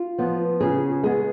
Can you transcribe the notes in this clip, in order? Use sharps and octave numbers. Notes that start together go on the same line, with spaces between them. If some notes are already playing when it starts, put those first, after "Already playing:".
Already playing: F4
F3 B3
C#3 G#4
G#3 B3 G#4